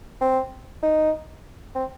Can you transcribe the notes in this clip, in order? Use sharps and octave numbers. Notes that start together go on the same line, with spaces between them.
C4
D#4
C4